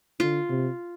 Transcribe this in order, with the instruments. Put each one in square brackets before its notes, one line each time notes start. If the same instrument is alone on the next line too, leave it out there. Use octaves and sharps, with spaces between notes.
[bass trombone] D3 [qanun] F4
[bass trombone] C3